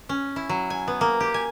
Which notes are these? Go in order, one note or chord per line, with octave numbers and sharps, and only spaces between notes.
C#4
E4
F#3
G#5
B3
A#3
G4
G#5